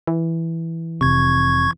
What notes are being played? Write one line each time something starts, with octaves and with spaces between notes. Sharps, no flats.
E3
F1 C3 C#6 G#6